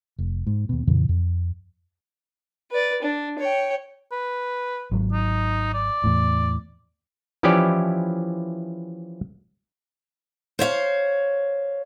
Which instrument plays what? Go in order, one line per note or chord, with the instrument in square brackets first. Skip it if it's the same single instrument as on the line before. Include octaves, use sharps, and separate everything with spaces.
[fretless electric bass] F1
G#2
D#2 B2
F2 A#2 C#3 E3
F2
[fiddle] B4 D5
D4
C#5 G5
[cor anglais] B4
[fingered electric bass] G#1 F#3
[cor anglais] D#4
D5
[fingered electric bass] E2 A2
[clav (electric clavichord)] E3 F3 C#4 E4 G4 D5
[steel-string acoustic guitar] C5 C#5 E5 F5